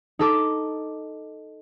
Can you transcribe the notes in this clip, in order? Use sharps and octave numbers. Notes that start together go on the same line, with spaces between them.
D#4 A4 D6